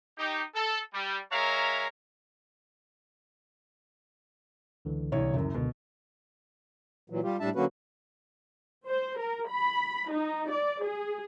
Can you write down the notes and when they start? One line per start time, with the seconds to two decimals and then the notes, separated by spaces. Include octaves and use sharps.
0.18 D#4 G4
0.55 A4
0.93 G3
1.32 G#3 A#4 C#5 E5 F5 A#5
4.85 C#2 D3 E3
5.12 C2 C#5
5.33 F#1 F#2
5.55 C#2 B2 D3
7.10 A#2 E3 F#3
7.23 G3 F4 G4
7.40 A2 G3 D4 E5 A5
7.55 D3 F#3 A#3 C#4 F#4 B4
8.86 C5
9.18 A#4
9.49 B5
10.11 D#4
10.49 D5
10.82 G#4